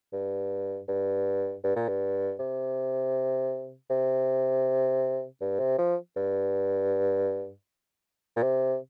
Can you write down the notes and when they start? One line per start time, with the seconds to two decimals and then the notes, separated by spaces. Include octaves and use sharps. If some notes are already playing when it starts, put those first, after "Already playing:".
0.13 G2
0.88 G2
1.64 G2
1.76 A#2
1.88 G2
2.39 C3
3.90 C3
5.41 G2
5.60 C3
5.79 F3
6.17 G2
8.36 A#2
8.43 C3